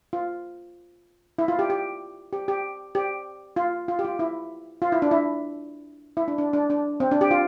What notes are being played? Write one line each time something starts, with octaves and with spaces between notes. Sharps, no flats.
F4
E4
F4
G4
G4
G4
G4
G4
F4
F4
G4
F4
E4
F4
E4
D4
E4
E4
D4
D4
D4
D4
C4
D4
G4
F4